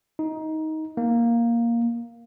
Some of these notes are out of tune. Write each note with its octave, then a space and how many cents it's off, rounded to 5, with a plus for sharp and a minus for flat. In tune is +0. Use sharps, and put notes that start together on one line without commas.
D#4 +15
A#3 +5